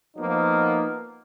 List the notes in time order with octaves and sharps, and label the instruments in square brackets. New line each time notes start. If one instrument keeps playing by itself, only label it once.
[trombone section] F3 A#3 B3 D#4